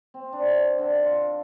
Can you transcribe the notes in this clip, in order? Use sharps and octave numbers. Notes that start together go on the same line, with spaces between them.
C4
D4
D3
F4